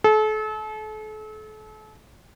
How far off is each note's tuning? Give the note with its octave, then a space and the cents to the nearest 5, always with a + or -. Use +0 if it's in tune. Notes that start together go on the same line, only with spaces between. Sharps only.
A4 -35